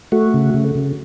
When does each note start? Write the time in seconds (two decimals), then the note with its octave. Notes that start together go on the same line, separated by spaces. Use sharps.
0.12 A3 F#4
0.34 C#3
0.54 C#3
0.75 C#3